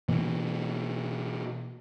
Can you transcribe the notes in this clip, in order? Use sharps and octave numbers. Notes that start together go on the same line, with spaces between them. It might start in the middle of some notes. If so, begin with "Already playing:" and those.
B2 E3 A#3